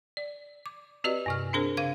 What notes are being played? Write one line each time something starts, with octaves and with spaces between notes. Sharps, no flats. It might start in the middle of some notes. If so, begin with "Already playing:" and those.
D5
D6
C4 F#4 G4 B4 D5 D#5
G2 C3 F6
C4 D4 G#4 A#4 C5
C#3 F5 G#6